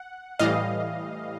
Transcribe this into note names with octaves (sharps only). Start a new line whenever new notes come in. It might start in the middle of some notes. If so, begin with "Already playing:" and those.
Already playing: F#5
A2 E3 G3 D#5 F5